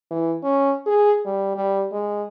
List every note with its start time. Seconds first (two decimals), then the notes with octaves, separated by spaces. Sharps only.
0.11 E3
0.44 C#4
0.87 G#4
1.26 G3
1.56 G3
1.92 G#3